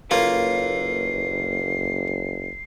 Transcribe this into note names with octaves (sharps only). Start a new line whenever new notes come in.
F#1 A#3 F4 A4 B4 C#5 C7